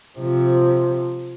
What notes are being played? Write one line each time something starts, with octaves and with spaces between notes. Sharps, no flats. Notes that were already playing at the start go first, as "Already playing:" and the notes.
C3 F3